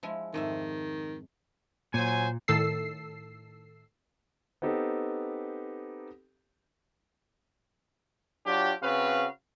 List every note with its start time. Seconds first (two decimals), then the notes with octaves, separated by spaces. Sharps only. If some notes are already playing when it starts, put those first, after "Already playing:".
0.03 F3 G#3 E4
0.34 F2 G#2 D#3 E5
1.94 A#2 F#3 C5 G#5
2.48 A2 D#3 A4 E6 C7
4.62 B3 C4 D#4 G4 A4
8.46 F#3 D4 F4 G4
8.82 C#3 C4 F#4 B4 F5